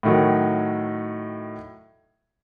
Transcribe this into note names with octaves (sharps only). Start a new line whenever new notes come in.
A2 D#3 F#3